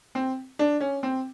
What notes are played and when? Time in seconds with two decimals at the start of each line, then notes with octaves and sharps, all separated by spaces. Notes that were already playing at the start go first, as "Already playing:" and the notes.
0.15 C4
0.59 D4
0.80 C#4
1.03 C4